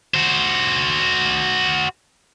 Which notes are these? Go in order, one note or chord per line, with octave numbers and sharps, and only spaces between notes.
F#4 C5